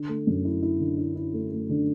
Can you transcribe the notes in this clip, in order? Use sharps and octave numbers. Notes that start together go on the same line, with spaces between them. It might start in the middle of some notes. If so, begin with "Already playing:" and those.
Already playing: D3
A3
F#2
E4
E4
D3
E4
E4
A3
A3
D3